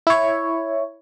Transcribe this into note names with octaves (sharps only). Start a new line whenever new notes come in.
E4 C#5